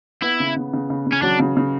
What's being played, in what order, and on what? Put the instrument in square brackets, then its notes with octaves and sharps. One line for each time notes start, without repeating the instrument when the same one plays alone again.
[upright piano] B3 [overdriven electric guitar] E4
[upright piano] C#3
C#3
C#3
C#3
C#3
[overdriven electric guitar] C#4
[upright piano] F#3 [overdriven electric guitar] D4
[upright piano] C#3
C#3